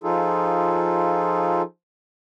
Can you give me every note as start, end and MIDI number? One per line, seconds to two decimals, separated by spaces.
0.04 1.62 53
0.04 1.62 63
0.04 1.62 65
0.04 1.62 68
0.04 1.62 69